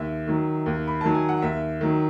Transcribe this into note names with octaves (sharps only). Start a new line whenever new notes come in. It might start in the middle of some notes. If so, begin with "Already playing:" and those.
Already playing: D#2 E5
D#3 F#3
D#2
B5
D#3 F#3 A5
G#5
F#5
D#2 E5
D#3 F#3